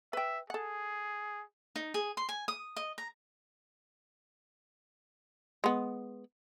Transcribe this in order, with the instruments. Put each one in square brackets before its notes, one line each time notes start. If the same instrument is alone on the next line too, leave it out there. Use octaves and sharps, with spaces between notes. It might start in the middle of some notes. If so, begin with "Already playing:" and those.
[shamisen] B4 G5 [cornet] E5
[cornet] G#4 [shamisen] A4 F#5
[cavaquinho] D#4
G#4
C6
G#5
D#6
D#5
A#5
[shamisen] G#3 B3